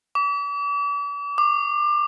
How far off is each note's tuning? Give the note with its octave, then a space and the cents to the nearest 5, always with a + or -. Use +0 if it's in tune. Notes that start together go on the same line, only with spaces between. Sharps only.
D6 -40
D6 +25